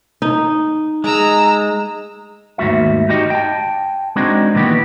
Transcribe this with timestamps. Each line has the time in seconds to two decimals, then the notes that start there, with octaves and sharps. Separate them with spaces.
0.22 D#4
1.04 G#3 A#5 E6
2.58 D#2 G#2 A3 F#4 E5
3.09 D#4 F#4 G4 D#5
3.30 G5 A5
4.16 G#3 C4 D4 D#4 F#4 G#4
4.54 A#2 D#3 E3 B3 F#4 G4